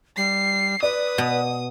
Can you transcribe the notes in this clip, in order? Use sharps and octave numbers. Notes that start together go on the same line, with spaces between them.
G3 C7
B4 D5 D#6
B2